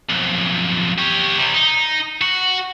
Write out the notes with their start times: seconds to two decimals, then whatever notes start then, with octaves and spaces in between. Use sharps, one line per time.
0.09 B1 F2
0.98 G4 C#5
1.37 C3 G3
1.54 D#4
2.21 F#4